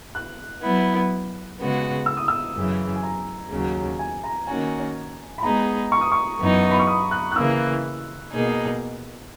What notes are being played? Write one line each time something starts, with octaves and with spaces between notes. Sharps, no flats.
F#6
F#3 B3 E4
C#3 G#3 B3 F#4
E6
D#6
E6
F#2 C#3 E3
G#5
A#5
D#2 C#3 F#3
G#5
A#5
D#3 A#3 C#4 F#4 G#5
B5
G#3 B3 D#4 G#4 A#5
C#6
D#6
C#6
F#2 E3 B3 D#4
A#5
B5
C#6
D#6
F#6
F#6
C#3 E3 A#3 E6
B2 A#3 D#4 G#4